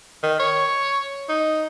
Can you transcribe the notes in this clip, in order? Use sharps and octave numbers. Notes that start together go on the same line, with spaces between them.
D#3
C#5
D#4